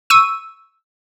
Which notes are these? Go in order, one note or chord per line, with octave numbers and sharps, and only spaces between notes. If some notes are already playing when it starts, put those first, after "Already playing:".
C#6 E6 D#7